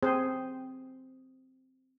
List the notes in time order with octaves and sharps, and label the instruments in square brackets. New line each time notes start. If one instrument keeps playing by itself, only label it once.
[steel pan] C4 G#4 C5